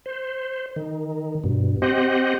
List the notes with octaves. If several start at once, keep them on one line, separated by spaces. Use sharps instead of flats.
C5
D#3
G2 B2
C4 G4 C5 D#5 F#5